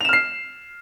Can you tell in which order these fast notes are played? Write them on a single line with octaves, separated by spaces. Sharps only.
F7 E7 F6 C7